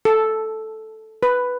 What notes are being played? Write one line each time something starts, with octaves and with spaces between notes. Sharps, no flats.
A4
B4